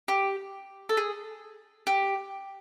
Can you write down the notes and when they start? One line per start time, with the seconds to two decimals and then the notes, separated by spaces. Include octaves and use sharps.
0.08 G4
0.89 A4
0.97 G#4
1.87 G4